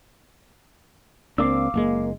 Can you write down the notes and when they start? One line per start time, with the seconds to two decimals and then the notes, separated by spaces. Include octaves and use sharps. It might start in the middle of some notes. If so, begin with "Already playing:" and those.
1.38 C#2 A#3 C4 D4 F5 D6 E6
1.74 F#1 B2 G#3 A#3